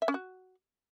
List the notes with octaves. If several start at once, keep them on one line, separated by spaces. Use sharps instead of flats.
E5
C#4
F#4